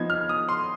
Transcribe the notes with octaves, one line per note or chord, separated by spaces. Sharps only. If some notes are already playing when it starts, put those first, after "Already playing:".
Already playing: F3 B3 D#4 G#6
F6
D#6
C6